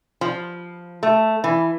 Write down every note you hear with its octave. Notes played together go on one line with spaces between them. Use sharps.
F3
A3
E3